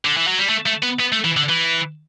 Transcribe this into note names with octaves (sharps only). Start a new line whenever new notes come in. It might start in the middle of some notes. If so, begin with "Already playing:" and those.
D3
E3
F#3
G3
A3
A3
B3
B3
A3
E3
D3
E3